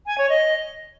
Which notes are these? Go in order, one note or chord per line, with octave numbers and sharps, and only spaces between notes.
G#5
C#5
D#5